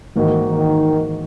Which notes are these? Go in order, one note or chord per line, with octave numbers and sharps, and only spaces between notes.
G#2 D#3 E3 A#3 D#4 F#4
D#3